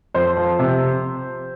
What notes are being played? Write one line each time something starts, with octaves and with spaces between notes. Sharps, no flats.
F2 C5
F3
C3